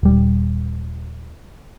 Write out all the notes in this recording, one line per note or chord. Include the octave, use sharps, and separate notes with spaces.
D#1 G3